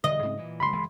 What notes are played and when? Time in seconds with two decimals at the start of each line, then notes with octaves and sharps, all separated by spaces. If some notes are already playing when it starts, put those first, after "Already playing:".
0.04 E1 D3 D#5
0.23 G#2 C#3 C4
0.37 A#2 E3
0.60 F#1 C#2 B5 C6
0.73 F#1 E3 G#3